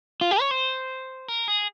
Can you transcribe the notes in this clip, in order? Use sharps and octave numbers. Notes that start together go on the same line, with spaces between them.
F4
G4
C#5
C5
A#4
G#4